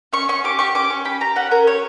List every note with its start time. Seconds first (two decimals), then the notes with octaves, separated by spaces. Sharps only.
0.13 C#4 C#6
0.28 C#4 C#6
0.44 G4 D6
0.59 G4 C#6
0.75 C#4 D6
0.90 C#4 C#6
1.05 G4 B5
1.21 G4 A#5
1.36 C#4 F#5
1.51 C#4 A#4
1.67 G4 C#5